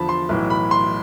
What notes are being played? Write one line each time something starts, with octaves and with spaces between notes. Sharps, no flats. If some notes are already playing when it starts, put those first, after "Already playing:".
Already playing: E2 D3 F3 A5 B5
C6
B1 A2 E3
B5
C6